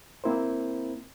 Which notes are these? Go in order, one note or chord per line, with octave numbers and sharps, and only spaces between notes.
A#3 C4 E4 A#4 C5